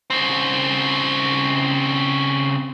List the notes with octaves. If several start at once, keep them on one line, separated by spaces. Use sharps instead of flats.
C#3 C4